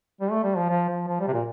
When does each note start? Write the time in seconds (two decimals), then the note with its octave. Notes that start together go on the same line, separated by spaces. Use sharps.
0.21 G3
0.31 A3
0.43 G3
0.57 F3
0.69 F3
0.89 F3
1.08 F3
1.20 G3
1.27 C3
1.33 A#2